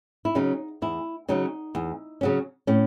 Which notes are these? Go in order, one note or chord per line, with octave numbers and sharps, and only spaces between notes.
E4
C#3 F#3 C#4 D#4
E2 E4
C#3 F#3 C#4 D#4
E2
C#3 F#3 C#4
A2 C#4